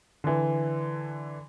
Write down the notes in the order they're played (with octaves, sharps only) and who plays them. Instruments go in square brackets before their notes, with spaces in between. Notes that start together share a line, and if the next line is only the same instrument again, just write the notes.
[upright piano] D3 E3